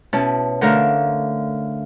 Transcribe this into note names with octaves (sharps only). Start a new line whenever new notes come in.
B2 C#4 E4 A5
D3 A3 A4 A#4 E5 F5